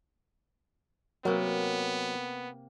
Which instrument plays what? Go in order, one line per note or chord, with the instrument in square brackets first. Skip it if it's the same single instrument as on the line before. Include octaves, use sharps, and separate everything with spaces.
[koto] C3 A#3 [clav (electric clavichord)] F#3 [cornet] B3